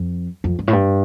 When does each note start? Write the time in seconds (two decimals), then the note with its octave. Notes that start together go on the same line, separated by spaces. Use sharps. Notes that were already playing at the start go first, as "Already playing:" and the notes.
Already playing: F2
0.44 F2
0.59 G2
0.68 A2
0.73 G2